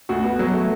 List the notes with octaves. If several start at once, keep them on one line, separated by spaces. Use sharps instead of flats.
D2 F#4
B3
F#3
A3